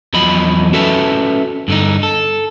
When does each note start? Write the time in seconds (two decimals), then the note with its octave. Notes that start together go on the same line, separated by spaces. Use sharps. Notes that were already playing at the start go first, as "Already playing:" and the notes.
0.14 E2 F3 F#3 D#5 B5
0.73 C#4 F#4 A4 B4 E5 A5
1.68 G2 D3 D#4
2.03 A4